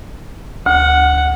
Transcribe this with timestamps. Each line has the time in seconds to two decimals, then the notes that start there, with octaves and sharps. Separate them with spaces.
0.66 D2 F#5